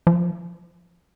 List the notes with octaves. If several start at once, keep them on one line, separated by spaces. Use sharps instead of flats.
F3